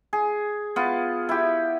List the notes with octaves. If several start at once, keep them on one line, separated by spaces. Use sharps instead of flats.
G#4
B3 F4
E4 G4